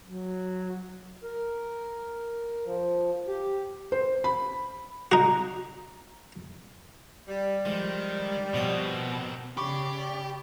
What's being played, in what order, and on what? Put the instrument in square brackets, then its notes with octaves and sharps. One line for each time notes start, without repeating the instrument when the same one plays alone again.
[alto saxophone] F#3
[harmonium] A#4
F3
G4
[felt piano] C5
B5
[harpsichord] D#4 F#4
[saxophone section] G3
[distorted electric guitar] D#3 [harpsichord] F3 G#3
[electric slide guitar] B2 [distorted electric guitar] D#3 C4 [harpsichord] F3 C#5 D#6
[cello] C#3 D5 [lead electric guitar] G4 [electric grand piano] B5 C#6 D6